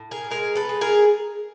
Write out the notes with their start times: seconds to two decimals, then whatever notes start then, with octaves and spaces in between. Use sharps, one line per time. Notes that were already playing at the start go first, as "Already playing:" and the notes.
Already playing: A2
0.11 G#4 A#4
0.30 G#3 G#4 A#4
0.55 A4 B4
0.69 G#3
0.81 G#4 A#4